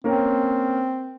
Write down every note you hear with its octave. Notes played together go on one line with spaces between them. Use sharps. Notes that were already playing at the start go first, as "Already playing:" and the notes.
A#3 C4 C#4 A#4